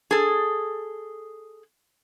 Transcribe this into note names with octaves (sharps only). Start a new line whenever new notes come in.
G#4 A4